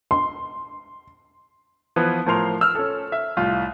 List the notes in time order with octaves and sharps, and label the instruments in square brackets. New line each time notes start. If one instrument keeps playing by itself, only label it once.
[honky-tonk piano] C6
[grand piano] E3 F3 B3 B4
A2 F3 A#4 C6 F7
E6 F6
C#4 A4
E5
C2 A2 F4